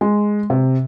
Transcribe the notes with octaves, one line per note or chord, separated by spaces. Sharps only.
G#3
C3